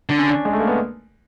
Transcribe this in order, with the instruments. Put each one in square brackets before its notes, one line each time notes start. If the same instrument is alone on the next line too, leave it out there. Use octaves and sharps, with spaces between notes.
[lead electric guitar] D3 [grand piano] D4
[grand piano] C#4
D4
G#3
A3
A#3
B3